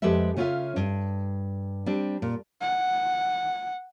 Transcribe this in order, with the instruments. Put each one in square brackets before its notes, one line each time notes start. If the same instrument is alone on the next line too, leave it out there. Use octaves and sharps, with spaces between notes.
[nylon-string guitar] F2 G#3 G4 A4 B4 E5
C#3 C#4 F4 A#4 E5 F5
G2
G3 C4 D4
A#2
[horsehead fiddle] F#5